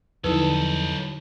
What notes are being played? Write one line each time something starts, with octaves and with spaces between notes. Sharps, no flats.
E2 D3 F3 F#3 D#4 E4 A4 B4